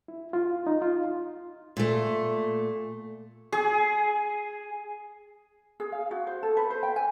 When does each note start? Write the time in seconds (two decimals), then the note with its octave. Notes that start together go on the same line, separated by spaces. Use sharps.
0.08 E4
0.33 F4
0.67 D#4
0.82 F4
1.77 A#2 A3
3.52 G#4
5.80 G#4
5.92 F5
6.11 F#4
6.27 C5
6.43 A4
6.57 B4
6.70 C5
6.83 G5
6.96 G#5